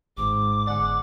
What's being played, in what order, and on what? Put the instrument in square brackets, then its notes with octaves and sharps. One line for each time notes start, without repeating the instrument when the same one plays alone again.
[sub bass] G#1 [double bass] G#2 [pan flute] D6
[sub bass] G1 [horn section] G#4 D5 F#5